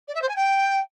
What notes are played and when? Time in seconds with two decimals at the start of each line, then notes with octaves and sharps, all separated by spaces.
0.08 D5
0.15 E5
0.22 C5
0.29 G#5
0.36 G5